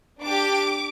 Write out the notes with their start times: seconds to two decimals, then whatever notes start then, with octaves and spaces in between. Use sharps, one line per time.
0.22 D4 G4 D6